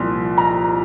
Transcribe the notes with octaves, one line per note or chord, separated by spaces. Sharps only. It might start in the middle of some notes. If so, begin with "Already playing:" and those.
Already playing: C2 A#2 F3 C6
A#5